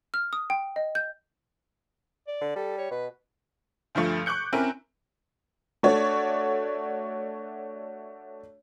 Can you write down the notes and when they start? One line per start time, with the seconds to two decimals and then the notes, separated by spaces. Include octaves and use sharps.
0.14 F6
0.33 D#6
0.50 G5
0.76 D#5
0.95 G6
2.27 D5
2.41 D3
2.56 G3 A4
2.78 C#5
2.91 B2 B4
3.95 D2 G2 F3 A3
4.26 C#6 D6 F#6 G6 C#7
4.53 C4 C#4 E4 A#4
5.83 A3 D4 F#4 C#5 D5